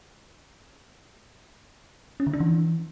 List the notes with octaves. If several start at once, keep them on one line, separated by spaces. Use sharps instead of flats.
C#4
D3
D4
E3